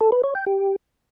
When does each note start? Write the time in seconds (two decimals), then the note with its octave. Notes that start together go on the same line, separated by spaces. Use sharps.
0.01 A4
0.12 B4
0.24 C#5
0.35 G5
0.46 G4